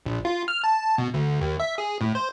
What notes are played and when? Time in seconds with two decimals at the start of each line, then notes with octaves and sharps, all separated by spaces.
0.06 A#1
0.25 F4
0.48 F6
0.64 A5
0.98 B2
1.14 D2
1.41 D#2
1.60 E5
1.78 G#4
2.01 A2
2.15 C5